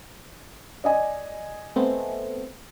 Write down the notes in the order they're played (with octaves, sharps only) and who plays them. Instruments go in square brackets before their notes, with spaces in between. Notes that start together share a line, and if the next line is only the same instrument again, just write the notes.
[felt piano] D5 D#5 G#5
[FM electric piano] A3 B3 C4